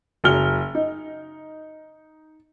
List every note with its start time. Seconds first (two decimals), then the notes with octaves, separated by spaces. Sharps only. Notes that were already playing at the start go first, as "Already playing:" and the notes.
0.24 F#1 F#3 F6 G7
0.75 D#4